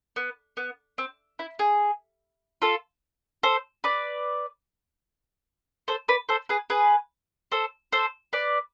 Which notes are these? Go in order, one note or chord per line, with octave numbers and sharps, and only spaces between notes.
B3
B3
C4
E4
G#4
F4 A4
A4 C5
B4 D5
A4 C5
B4 D5
A4 C5
G#4 B4
G#4 B4
A4 C5
A4 C5
B4 D5